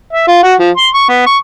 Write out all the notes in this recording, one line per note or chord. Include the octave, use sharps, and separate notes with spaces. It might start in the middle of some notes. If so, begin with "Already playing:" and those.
E5
F4
F#4
F3
C6
C#6
B3
C#6